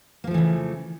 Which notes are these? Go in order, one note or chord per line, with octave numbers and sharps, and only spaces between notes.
C#3 E3 F3 A3 A#3